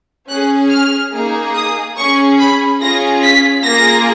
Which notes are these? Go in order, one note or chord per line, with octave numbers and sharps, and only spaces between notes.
C#4 G#4 F#6
F6
A#3 D#4 G#4
D#6
C#4 G#4 C#6
B5
C#4 F4 G#4 A#6
B6
A#3 F4 G#4 A#6